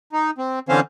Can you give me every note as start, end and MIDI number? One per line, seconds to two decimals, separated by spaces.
0.13 0.31 63
0.38 0.59 60
0.69 0.80 50
0.69 0.80 52
0.69 0.80 60
0.69 0.80 61
0.69 0.80 72
0.69 0.80 77